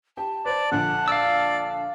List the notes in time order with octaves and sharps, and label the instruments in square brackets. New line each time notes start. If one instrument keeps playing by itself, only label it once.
[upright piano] G4 G5 [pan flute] A5
[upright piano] B4 C5 [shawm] D5
[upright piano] A#1 D3 [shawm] F#5
[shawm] D5 [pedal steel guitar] F5 E6